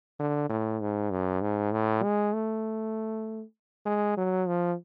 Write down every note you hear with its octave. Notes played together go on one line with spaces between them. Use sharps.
D3
A2
G#2
F#2
G#2
A2
G#3
A3
G#3
F#3
F3